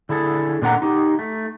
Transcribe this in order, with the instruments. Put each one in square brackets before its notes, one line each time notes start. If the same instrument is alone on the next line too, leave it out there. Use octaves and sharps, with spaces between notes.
[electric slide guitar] D3 E4 G#4 A4
A#2 D3 D4 F#5 A#5
D#4 G4
A3